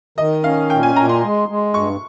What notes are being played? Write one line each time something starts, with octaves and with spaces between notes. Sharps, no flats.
D#3 D#5
C#4 F5
A#2 G5
G#5
A#2 A#5
C6
G#3
G#3
G2 C#6